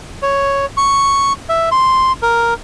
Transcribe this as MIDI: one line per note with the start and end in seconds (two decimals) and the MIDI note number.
0.22 0.66 73
0.77 1.33 85
1.49 1.69 76
1.72 2.12 84
2.22 2.54 70